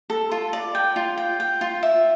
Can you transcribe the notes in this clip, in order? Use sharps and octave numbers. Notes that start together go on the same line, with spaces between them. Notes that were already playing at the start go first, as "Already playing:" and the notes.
A4
F4
D5
G5
F4
G5
G5
F4
E5